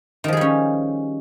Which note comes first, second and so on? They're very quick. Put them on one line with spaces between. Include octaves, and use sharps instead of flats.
D#3 F3 G#4 G3 C#4